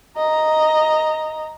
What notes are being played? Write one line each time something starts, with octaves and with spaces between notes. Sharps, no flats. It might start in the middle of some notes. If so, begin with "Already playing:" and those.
D#5 A#5